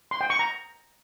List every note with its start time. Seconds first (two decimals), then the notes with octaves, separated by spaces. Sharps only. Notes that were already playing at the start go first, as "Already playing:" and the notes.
0.11 C6
0.21 G5
0.30 C#6
0.39 A#5